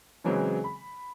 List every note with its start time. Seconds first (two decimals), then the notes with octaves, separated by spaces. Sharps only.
0.24 C#3 E3 F#3 G#3 C4
0.64 B5